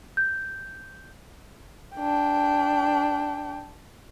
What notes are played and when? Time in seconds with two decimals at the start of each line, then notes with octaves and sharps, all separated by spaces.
0.17 G6
1.96 D4 G5